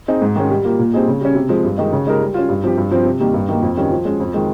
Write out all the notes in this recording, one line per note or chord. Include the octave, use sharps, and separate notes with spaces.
C4 D#4 G#4
G#2
D#3 G#3 C#4
G3
A#3 F4
A#2
G3 C4 D#4 G#4
C#3
G3 C#4
C3
F3 G#3
G2
D#3 G#3 D#4 G4
C#3
G#3 D#4 G4 A#4
G3
C#4 F4
G2
F3 C4 G4
G2
F3 C4
C3
D#3 G3 A#3
G2
D#3 A#3
F2
D#3 G3 C#4
F3
G#3 C#4
F2
D#3 G#3